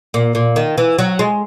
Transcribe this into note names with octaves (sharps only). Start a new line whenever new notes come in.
A#2
A#2
D#3
E3
F#3
G#3